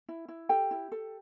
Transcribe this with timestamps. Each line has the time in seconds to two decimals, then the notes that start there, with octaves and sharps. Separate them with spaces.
0.09 E4
0.28 E4
0.49 G4 A4 G5
0.71 E4
0.92 A4